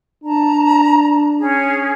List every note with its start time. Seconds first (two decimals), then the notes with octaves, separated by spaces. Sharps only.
0.24 D4 A5 A#5
1.39 C#4 G#4